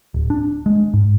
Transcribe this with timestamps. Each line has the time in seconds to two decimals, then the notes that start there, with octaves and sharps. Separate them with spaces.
0.14 D1
0.30 D4
0.66 G#3
0.94 G#2